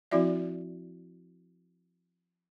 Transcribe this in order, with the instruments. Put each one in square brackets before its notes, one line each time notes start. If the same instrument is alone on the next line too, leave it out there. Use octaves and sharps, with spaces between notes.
[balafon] F3 C4 E4 F#4 D5 E5